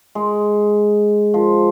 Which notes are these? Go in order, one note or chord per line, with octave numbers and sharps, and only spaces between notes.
G#3
F3